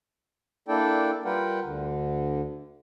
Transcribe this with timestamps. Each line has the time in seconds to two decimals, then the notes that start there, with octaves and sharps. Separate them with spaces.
0.68 A#3 D4 E4 A4 D5 G5
1.25 G3 F4 A#4 B4 F#5 G5
1.64 D2 D3